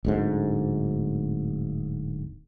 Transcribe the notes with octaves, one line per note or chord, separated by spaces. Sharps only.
D1 D2 G#2